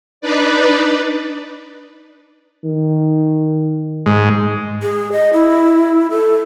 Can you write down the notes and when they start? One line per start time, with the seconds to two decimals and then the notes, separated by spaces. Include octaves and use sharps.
0.21 D4 D#4 B4 D5
2.65 D#3
4.06 G#2
4.83 G#4
5.12 D#5
5.33 E4
6.11 A4